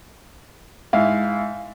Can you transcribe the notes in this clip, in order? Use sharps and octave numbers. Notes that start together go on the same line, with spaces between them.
G#2 E4 F5